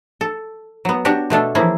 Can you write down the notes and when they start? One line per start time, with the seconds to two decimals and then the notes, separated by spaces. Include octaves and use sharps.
0.21 A4
0.85 F#3 B3
1.05 D4 F#4 G4
1.30 B2 A3 D4 A4
1.55 E3 F3 A#3 C#4 E4 G#4